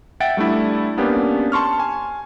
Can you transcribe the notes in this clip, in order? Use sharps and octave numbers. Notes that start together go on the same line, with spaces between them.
E5 F#5 G5 A6 D7
G3 A3 D4 E4
A#3 B3 C#4 D4 G4
A5 C6 C#6 F6
G#5